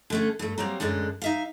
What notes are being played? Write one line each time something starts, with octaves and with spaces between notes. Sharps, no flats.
D3 A3 C#4
G2 A3
F#3 G3 A#3 C4
F#2 A2 D3 G#3 D4
D#4 E5 F5